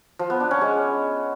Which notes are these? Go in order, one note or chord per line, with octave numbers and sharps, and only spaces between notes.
F3
B3
D4
C#4
G#3